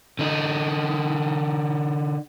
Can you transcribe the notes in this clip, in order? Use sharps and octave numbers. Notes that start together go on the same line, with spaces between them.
D3 D#4